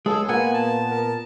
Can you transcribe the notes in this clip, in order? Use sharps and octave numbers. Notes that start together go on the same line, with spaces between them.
C#2 G#3 G#4 A4
A#2 A#3 B3 F#5 G#5
A5
A#4